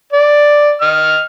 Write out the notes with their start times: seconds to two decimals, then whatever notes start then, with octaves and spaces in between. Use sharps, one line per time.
0.13 D5
0.81 D#5 F6